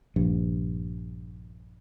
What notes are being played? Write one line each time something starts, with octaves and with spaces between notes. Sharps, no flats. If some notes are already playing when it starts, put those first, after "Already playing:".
A#1 G2